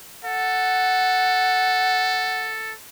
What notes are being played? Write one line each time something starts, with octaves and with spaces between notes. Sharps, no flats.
A4 F#5